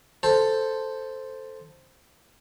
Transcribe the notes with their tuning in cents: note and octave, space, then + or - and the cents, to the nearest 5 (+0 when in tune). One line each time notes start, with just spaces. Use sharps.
A4 +0 C5 +0 A5 +0